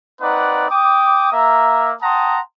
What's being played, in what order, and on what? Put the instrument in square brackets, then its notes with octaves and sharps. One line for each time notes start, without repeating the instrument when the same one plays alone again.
[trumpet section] A#3 C4 D#4 B4 D5 F#5
G5 D6 D#6
A#3 E5 A#5
F#5 G5 A5 A#5 C6 D#6